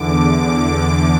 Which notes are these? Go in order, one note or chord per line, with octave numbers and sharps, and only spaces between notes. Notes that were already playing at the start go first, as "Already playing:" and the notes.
Already playing: E2 D3 D6